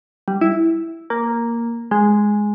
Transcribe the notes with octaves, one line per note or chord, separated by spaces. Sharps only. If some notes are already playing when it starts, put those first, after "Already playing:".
G3
E4
A#3
G#3